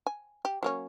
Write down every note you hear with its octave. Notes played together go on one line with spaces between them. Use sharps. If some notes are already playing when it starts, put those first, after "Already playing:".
G#5
G4
F#3 A#3 C#4